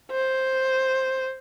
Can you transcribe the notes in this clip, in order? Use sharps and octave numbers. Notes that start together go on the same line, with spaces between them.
C5